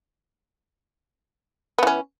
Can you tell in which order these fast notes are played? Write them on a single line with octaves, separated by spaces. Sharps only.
B3 E3 C#4